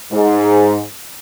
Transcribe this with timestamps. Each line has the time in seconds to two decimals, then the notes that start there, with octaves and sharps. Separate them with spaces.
0.12 G#2